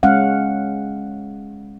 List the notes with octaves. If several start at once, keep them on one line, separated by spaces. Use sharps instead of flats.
G#3 C#4 F5 F#5